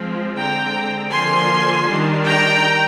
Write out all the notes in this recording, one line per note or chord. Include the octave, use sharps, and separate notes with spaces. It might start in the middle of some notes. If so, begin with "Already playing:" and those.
Already playing: F3 G#3 C4
D3 G#3 C4 G5 A#5
D3 F3 A#3 G#5 C6
D#3 G3 D4
G5 A#5